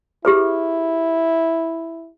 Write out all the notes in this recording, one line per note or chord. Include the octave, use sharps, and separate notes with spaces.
E4 G4 G#4 B4